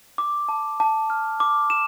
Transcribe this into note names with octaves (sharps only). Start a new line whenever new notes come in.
D6
A5
A5
F6
D6
E7